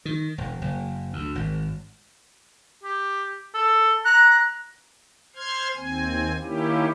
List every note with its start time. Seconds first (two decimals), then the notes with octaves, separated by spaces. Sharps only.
0.05 D#3
0.38 E1
0.61 F#1
1.13 D2
1.35 G#1
2.84 G4
3.54 A4
4.05 A#5 F#6
5.36 C5 C6 F6 G#6
5.76 D#2 C4 G#5
6.41 D#3 A#3 C#4 E4 G4